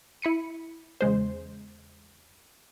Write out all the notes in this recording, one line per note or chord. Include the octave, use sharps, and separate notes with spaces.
E4 B5 C#7 D#7
E2 C#3 G#3 C5